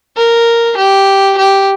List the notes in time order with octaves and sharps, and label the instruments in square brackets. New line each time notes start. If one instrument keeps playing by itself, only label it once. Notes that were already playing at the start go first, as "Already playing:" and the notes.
[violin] A#4
G4
G4